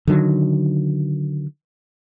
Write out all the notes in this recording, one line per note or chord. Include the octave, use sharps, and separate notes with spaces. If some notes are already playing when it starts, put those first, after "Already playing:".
D3 D#3 F#3